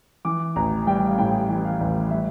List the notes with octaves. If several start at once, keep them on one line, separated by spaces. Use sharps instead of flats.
E3 D6
A1 A#5
G3 G5
F5
A2 G5
E3
F5
A1
G3 E5